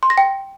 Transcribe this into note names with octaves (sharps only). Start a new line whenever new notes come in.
C6
A#6
G5